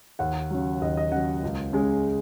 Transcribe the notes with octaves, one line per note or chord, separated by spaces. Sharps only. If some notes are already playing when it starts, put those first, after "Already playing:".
D#2 F#5
C#3 F#3
D#2 D#5
D#5
C#3 F#3 F#5
C#2
C#3 G#3